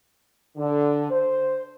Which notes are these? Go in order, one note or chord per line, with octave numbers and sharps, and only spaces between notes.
D3
C5